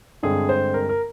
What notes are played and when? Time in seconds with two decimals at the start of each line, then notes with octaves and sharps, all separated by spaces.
0.23 G2 D3 G#3 C4 G#4
0.49 C5
0.74 A#4
0.89 A#4